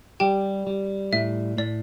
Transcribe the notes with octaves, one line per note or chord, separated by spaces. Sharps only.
G3 G4 G5
G3
A2 E5
A2 D5